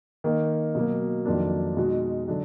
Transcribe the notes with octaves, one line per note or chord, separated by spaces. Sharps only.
D#3 A#3 D#4
B2 F#3 A#3
F2 D#3 F#3 A#3 D4
B2 G#3 D#4 F#4
D3 F#3 D4 F#4